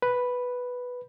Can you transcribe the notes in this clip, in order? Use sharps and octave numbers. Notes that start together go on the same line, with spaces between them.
B4